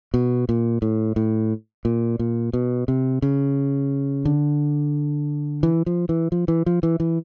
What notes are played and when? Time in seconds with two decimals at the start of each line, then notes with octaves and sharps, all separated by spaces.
0.14 B2
0.49 A#2
0.82 A2
1.16 A2
1.85 A#2
2.19 A#2
2.53 B2
2.88 C3
3.22 C#3
4.25 D3
5.63 E3
5.86 F3
6.09 E3
6.32 F3
6.48 E3
6.66 F3
6.83 E3
7.00 E3